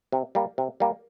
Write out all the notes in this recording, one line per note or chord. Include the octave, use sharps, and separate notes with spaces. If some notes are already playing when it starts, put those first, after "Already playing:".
C3
G3 A#3
C3
G3 A#3